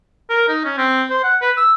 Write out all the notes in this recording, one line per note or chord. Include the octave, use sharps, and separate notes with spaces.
A#4
D#4
C#4
C4
C5
F#5
B4
E6